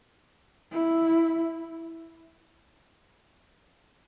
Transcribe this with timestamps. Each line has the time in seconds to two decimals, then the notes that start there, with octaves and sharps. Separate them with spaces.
0.72 E4